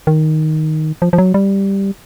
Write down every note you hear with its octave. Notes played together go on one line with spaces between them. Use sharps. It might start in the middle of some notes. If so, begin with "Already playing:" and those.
D#3
F3
F3
F#3
G3